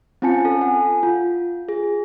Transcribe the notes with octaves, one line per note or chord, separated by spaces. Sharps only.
C4 C#4 F4 G#5 A5 C#7
F4 A4
F#5 G#5
F4
G#4